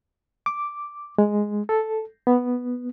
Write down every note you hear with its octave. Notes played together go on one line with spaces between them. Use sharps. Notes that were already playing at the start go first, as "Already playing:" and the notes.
D6
G#3
A4
B3